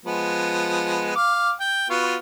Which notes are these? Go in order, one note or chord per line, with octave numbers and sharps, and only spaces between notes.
F3 G#3 B3
F5 D6
G5
B3 F4 F#4